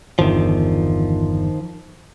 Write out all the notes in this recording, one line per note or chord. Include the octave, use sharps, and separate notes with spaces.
G1 E2 D#3 F3